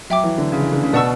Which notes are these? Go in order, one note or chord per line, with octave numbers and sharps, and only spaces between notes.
F#3 E5 G5 D6
E3
D3
C#3
E3
D3
C#3
B2 D5 F#5 A5 C#6 E6